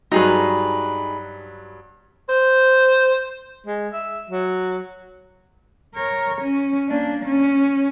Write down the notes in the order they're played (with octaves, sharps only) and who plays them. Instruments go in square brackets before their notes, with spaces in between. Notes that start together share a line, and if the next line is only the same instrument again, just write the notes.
[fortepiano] G2 F#3 [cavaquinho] D#4 G#4 B4
[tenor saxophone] C5
G#3
E5
F#3
[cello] A#4 C#5
C#4
A#3 D4
C#4